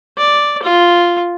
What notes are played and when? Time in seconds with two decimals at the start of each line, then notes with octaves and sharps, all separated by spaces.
0.17 D5
0.63 F4